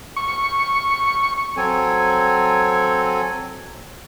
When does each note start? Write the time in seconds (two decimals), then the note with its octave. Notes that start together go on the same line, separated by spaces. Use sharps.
0.16 C#6
1.57 F#3 C4 A4 C#5 G#5